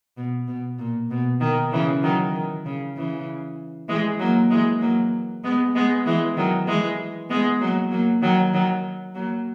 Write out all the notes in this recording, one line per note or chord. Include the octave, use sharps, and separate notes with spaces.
B2
B2
A#2
B2
D#3
C#3 E3
D#3 F#3
D#3
C#3
C#3 E3
E3 G#3
F#3 A#3
E3 G#3
F#3 A#3
G#3 B3
G#3 B3
E3 G#3
D#3 F#3
E3 G#3
G#3 B3
F#3 A#3
F#3 A#3
D#3 F#3
D#3 F#3
F#3 A#3